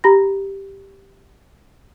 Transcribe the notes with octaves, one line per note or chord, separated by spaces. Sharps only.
G4 A#5 B5 A#6